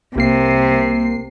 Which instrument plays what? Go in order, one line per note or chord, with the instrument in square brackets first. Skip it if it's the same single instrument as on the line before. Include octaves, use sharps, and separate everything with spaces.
[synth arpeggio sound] C2 A#3 C7 [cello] C3